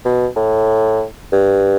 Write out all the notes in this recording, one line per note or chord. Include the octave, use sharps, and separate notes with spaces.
B2
A2
G2